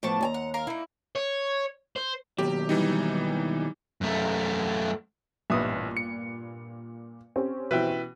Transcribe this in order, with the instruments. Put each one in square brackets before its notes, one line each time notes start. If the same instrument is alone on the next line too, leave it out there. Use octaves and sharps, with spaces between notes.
[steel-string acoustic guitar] A2 F3 B3 [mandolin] D5 A5 C#6
[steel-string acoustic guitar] D#2 G#5 A#5
[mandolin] F#5
A#4 F5
[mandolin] A#3 D#4 [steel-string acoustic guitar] E4
[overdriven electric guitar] C#5
C5
[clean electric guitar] D#2 B2 F#3 [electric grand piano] G4
[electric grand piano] E3 G3 D#4
[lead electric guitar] F#2 A3
[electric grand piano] A1 E5 [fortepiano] G2 B3 D#6 [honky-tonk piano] A#2
[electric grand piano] C#7
[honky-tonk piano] C4 C#4 G4
[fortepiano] B2 E3 [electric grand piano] B4 E5 G5